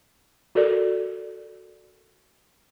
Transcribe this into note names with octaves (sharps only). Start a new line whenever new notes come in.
F#4 A4 A#4 D5